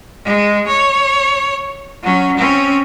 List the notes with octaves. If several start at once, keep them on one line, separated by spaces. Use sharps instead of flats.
G#3
C#5
F#3 C#4
C4 C#4